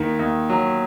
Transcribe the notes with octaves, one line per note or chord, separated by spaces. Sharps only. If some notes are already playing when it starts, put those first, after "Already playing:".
Already playing: D#2 D#3
D#2
F#3